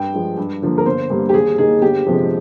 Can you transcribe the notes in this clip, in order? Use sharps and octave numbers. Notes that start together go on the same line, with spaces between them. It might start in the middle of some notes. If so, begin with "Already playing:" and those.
Already playing: G2 G5
F3 G#3
G2
D3 F3 A#3
A#4
G1 C5
G2 D3 G3 A#3
G4
D#2 G#4
D#3 A#3 G#4
G1 G4
F2 C3 F3 G#3